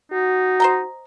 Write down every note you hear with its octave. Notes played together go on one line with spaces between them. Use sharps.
D#4 F#4
C5 D#5 A#5